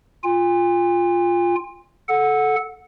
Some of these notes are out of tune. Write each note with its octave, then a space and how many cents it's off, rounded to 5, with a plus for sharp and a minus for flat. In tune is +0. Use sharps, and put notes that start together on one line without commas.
F4 +0 G#5 -45
A4 -20 F#5 -10